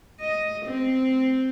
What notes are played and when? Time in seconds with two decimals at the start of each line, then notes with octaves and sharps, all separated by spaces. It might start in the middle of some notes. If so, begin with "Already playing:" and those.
0.20 D#5
0.66 C4